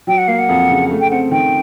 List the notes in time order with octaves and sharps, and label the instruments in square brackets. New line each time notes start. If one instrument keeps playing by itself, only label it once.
[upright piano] F#3 [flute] G5
[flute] F#5
[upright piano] A#3 [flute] F5
[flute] F#5
[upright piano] F2
C#3
A3
[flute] G5
[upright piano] C4 [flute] F#5
[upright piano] D#3 [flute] G5